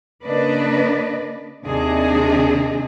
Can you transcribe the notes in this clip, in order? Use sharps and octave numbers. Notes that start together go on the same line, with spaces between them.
C#3 A#3 D4 B4 D5 D#5
D#2 C3 D4 G#4 D#5